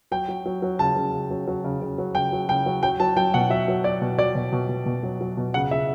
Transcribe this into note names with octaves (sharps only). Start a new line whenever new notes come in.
F#3 G5
F#3
F#3
F#3
C#3 A5
C#3
C#3
F#3
F#3
C#3
C#3
F#3
C#3 G5
F#3
C#3 G5
F#3
F#3 G5
F#3 A5
F#3 G5
B2 F#5
F#3 E5
F#3
F#3 D5
B2
F#3 D5
B2
B2
B2
B2
F#3
F#3
B2
C#3 F#5
C#3 E5